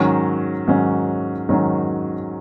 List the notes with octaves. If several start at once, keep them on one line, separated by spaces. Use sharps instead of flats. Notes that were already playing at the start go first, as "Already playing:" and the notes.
Already playing: G#2 D#3 F#3 C#4
G#2 D#3 F#3 C#4
G#2 D#3 F#3 C#4